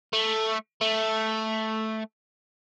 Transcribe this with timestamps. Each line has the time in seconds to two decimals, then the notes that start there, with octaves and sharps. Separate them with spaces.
0.13 A3
0.81 A3